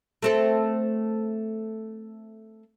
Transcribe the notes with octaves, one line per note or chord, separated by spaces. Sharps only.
A3 C4 A4